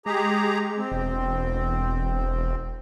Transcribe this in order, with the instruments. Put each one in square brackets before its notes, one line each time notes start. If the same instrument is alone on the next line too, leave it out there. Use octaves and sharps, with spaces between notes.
[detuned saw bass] G#3 [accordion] G4 G#4 A#5
[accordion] C4
[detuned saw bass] E1